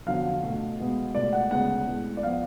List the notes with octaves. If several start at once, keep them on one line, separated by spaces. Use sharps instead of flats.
F2 D3 F#3 B3 F5
B2 A3
B2 G#3 B3
C#2 B2 A3 D5
F#5
D2 C#3 G#3 B3 F#5
A2 G#3 B3
D5
F3 B3 F5